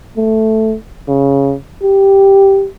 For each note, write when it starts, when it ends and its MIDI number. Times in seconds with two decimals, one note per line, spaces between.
0.17 0.75 57
1.08 1.55 49
1.83 2.67 67